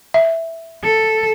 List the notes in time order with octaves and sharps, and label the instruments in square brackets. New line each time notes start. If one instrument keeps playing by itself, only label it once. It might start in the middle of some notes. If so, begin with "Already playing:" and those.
[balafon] E5
[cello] A4